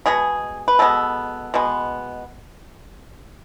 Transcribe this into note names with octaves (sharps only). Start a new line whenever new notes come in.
B2 G#3 B3 G#4
B4
B2 G#3 B3 A4
B2 G#3 B3